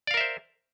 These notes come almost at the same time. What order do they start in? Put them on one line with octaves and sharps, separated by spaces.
D5 F5 A#4 E5 C5